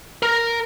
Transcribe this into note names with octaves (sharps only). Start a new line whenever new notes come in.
A#4